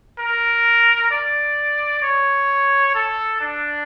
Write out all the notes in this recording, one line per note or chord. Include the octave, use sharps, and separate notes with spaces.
A#4
D5
C#5
A4
D4